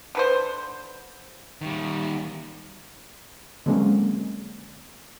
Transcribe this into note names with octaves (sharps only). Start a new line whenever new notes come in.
D3 B4 C5
D#3 G3
D3 F#3 G#3 A#3 C4 C#4